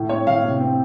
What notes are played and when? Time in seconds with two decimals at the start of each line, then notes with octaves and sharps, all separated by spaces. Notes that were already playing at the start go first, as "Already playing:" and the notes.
Already playing: A2
0.09 C4 C#5
0.27 A2 F5
0.44 C3
0.60 C4